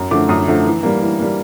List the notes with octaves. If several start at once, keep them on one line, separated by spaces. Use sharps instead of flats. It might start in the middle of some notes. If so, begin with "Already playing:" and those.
Already playing: F#2
D3 F3 A3 D6
F#2 D#6
D3 F3 A3
E3
G3 A#3
E3
G3 A#3